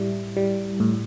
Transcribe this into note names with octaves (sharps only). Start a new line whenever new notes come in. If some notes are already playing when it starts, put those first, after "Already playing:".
Already playing: A2 G3 E4
G3
A2